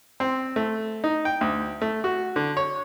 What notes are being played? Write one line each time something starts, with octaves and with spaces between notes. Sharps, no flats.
C4
A3
D#4
G5
D2
A3
F#4
D3
C#5